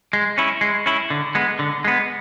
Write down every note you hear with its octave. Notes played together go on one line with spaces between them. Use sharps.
G#3
C#4 E4
G#3
C#4 E4
D3
G#3 B3
D3
G#3 B3